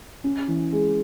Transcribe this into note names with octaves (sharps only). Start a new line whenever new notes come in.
C#4
E3
G#3